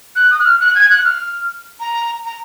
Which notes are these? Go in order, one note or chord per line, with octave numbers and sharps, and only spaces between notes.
F#6
D#6
F#6
F6
F#6
G#6
F#6
F6
A#5
A#5